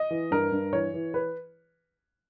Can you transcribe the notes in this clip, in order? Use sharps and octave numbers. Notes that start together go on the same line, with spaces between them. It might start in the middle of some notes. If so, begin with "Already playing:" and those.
Already playing: D#5
E3
G2 A#4
G2
E3 C#5
E3
B4